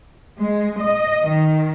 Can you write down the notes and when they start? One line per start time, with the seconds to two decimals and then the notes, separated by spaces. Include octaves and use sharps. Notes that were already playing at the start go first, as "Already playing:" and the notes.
0.39 G#3
0.80 D#5
1.22 D#3